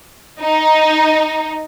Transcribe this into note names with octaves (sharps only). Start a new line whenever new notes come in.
D#4